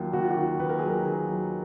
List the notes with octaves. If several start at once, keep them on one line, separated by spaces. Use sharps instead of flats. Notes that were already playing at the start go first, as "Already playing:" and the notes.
Already playing: D#2 F#3 F4
D#2 F#4
F4
F#4
D#3
D#2 B4
A#4
F#3 G#4
A#4
D#2 G#4
F#3